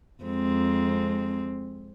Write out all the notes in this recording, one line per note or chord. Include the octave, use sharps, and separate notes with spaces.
F2 G#3 C4